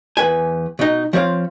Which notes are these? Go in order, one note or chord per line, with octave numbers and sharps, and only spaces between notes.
E2 B4 G#5
B2 D#4
F3 C4 C#5 F5